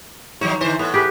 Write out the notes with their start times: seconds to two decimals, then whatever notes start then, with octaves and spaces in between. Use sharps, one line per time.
0.41 D#3 F#3 D#4 C#5
0.61 D3 E3 C5
0.79 A2 B3
0.94 G4 G#4 B4